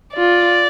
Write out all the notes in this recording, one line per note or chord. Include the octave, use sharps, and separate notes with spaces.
F4 D5